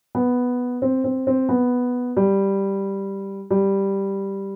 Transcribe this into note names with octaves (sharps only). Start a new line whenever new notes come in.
B3
C4
C4
C4
B3
G3
G3